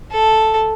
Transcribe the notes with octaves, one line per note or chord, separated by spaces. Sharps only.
A4